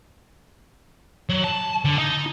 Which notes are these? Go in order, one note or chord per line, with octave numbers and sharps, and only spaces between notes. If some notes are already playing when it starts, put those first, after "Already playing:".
F#3
A5
D3
D#4